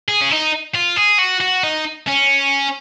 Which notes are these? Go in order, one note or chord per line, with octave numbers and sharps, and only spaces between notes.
G#4
C#4
D#4
F4
G#4
F#4
F#4
D#4
C#4